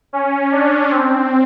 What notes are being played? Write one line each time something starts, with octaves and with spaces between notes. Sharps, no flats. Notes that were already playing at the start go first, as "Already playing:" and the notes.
C#4
D4
C4